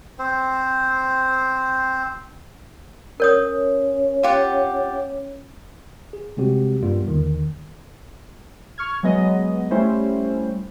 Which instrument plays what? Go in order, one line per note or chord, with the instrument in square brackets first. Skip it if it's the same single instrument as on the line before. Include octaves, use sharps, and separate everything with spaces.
[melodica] C4 C5
[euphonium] C#4 [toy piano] A#4 C#5 D#6
[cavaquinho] F4 G4 F#5
[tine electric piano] G#4
C3 G3 G#3 C4 F#4 G4
G2 G3 A#3 B3 F4
D#2 D3 D#3
[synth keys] C#6 F6 G#6
F#3 G#3 B3 D#5
G3 A3 C#4 E4 C5